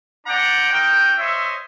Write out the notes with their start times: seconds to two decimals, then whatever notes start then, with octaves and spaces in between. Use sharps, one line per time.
0.27 C4 D4 D5 F#5 G5 A#5
0.71 D#4 F#4 A#4 G5
1.18 C5 C#5 D#5 E5